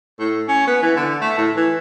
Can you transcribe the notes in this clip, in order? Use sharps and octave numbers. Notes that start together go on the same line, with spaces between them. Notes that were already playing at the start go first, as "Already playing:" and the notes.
A2
C#4
B3
E3
D3
A3
A2
E3